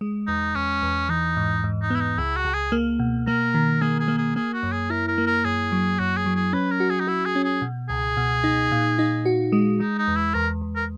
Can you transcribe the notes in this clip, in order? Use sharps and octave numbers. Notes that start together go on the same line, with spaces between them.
G#3
E2 D#4
E2 C#4
E2
E3 D#4
G#2
G#2
D#4
B3 E4
D#4
C#2 E4
F#4
C#2
G#4
A#3
B2
A#3 A#4
D#3
A#3 G#4
G#4
A#3
G#4
A#3 G#4
F#4
F#2
G#4
E4 A#4
A#4
A#3
A#4
F#2 G#4
F#3
F#2 F#4
G#4
F#3
G#4
C#4 B4
A#4
F#4
G#4
D#4
E4 F#4
G#4
C#4
G#4
B2
C#2 G#4
B2
D#4
A#2
D#4
F#4
G#3
G#3 D#4
D#4
E2
E4
E2 A#4
E2
A#4